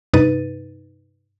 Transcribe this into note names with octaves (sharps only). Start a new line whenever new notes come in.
G2 C3 D#4 B4 A6 D#7